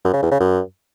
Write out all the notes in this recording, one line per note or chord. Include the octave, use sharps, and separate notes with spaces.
F#2
C#3
E2
C#3
F#2